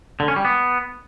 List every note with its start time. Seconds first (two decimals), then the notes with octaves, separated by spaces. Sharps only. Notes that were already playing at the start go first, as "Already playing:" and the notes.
0.20 D3
0.28 C#4
0.36 G3
0.45 B3